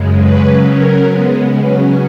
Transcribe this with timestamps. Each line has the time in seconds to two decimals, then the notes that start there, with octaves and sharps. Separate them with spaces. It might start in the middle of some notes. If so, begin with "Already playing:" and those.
Already playing: F#2 C#3 G#3
0.17 B4
0.45 C#3 F#3 C#4 B4
0.74 A#4
1.03 C#3 G#3 B3
1.60 C#3 F#3 C#4 B4